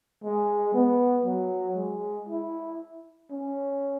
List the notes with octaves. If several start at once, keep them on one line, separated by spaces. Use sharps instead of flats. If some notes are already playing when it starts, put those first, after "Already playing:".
G#3
B3
F#3
G#3
E4
C#4